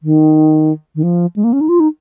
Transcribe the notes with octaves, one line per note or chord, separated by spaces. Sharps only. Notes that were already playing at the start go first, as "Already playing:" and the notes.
D#3
D#3
F3
G#3
A#3
C#4
D#4
F4
D#4